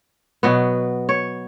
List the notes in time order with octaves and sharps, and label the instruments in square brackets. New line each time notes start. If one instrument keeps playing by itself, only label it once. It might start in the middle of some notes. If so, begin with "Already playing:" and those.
[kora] B2 F#3 B3
C#5